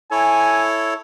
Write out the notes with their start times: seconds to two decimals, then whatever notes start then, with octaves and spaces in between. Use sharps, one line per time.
0.11 E4 A4 C#5 G#5